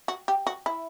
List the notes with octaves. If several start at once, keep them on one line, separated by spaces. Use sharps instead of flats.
F#4
G4
F#4
E4